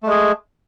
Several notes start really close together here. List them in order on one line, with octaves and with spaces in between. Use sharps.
A3 G#3 G#4